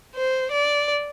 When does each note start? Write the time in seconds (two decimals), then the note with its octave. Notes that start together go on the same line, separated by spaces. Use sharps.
0.15 C5
0.52 D5